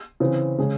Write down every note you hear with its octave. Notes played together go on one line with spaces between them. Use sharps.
C#3 E3 C4
C#3 G#3 C#4 G#4